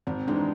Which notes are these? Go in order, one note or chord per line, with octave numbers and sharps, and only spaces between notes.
G#1 C4
G#2 E3 G#3 D4